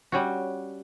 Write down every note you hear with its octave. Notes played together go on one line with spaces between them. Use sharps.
G3 C#4 F#4